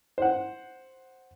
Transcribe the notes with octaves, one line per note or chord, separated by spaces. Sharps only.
C5 F#5